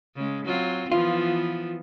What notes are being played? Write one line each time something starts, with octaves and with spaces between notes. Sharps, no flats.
C#3 G#3
F#3 C4 F4
E3 F3 B3 F4